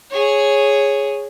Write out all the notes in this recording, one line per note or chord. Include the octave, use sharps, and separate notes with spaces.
G#4 C#5